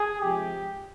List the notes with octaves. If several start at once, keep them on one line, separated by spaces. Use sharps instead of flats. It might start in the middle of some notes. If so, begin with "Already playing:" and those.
Already playing: G#4
C3 F3 G#3 G4